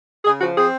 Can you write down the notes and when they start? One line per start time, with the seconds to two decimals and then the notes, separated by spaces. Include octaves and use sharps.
0.25 C#3 G#4
0.40 F3 F#4
0.56 C4 G#4